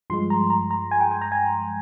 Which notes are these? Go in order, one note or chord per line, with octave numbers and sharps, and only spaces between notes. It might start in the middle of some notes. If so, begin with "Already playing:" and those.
G2 F3 G#3 C6
A#5
A#5
A#5
G#5
G5
G#5
A#5
G#5